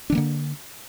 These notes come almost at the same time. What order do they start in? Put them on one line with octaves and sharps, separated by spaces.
D4 D#3 A#3 D3